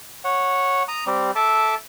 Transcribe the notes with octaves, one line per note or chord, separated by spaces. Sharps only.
C#5 F#5
A#5 D#6
G3 C4 G4
A4 E5 A5 D6